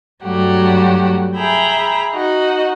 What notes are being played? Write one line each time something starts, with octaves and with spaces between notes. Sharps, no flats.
G2 F#3 G3 A3 F#4 G4
G#4 E5 G5 A#5 B5
D#4 F#4 D#5